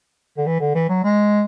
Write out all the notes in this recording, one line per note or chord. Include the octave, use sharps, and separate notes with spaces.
D3
E3
D3
E3
F#3
G#3